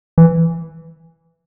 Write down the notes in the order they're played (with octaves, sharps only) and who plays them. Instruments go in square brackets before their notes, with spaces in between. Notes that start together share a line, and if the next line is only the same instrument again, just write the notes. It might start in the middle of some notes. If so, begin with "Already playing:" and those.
[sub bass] E3